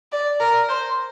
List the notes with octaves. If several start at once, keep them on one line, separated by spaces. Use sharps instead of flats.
D5
A#4
C5